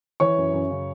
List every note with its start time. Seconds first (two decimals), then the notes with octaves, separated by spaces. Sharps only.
0.20 E3 C#5 C#6
0.37 F#2
0.54 F#2
0.70 C#3